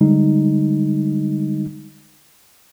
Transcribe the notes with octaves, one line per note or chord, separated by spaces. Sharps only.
D3 G3 G#3 D#4